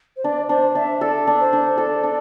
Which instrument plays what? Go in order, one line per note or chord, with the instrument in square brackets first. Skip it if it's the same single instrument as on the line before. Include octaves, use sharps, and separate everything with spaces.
[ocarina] C5
[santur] D4 [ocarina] D5
[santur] D4 [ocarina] C5
[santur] D4 [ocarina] E5
[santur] A4 [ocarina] D5
[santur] D4
[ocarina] C5
[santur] D4
[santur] A4 [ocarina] D5
[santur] D4